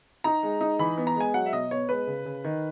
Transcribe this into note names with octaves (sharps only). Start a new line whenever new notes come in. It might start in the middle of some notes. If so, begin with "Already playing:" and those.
D#4 A#5
G#3
D#4
E3 B5
B3
A#5
G#3 G#5
F#3 F#5
E5
B2 D#5
B3 C#5
G#3 B4
C#3
C#3
D#3